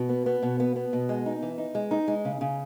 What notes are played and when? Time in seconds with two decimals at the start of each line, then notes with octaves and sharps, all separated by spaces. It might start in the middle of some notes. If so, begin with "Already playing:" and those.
Already playing: B2
0.09 B3
0.26 B3
0.43 B2
0.60 B3
0.76 B3
0.93 B2
1.09 G#3
1.26 D#4
1.42 E3
1.58 D#4
1.75 G#3
1.91 D#4
2.08 G#3
2.25 C#3
2.41 C#3